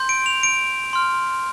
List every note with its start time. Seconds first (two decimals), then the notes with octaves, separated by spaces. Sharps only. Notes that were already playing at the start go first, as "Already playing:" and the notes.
Already playing: C6 G6
0.09 D7
0.26 F7
0.43 D7
0.93 C6 F6